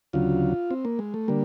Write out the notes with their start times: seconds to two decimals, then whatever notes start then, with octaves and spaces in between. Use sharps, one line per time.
0.13 D2 C#3 F#3 F4
0.71 C4
0.85 A#3
0.99 G#3
1.14 A3
1.28 D3 G3 A#3